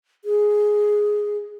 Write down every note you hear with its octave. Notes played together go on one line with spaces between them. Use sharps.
G#4